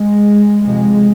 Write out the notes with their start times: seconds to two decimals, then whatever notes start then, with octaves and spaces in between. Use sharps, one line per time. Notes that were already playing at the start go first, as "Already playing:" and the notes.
Already playing: G#3
0.66 F2 C3 G#3